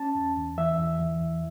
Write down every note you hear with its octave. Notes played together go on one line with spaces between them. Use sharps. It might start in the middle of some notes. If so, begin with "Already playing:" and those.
Already playing: C#4 A5
E2
E2
E3 E5
E2
E3
E2